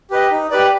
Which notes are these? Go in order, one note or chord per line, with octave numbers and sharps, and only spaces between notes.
G4 B4 D#5
D#4
G4 B4 D5